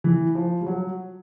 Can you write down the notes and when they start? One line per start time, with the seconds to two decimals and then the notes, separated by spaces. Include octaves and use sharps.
0.04 E3
0.35 F3
0.61 G3
0.66 F#3